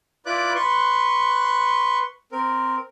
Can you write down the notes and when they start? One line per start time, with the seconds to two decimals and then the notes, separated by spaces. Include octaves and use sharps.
0.26 E4 F4 B4 D5 D6 F#6
0.55 B4 C6 C#6
2.32 C4 A#4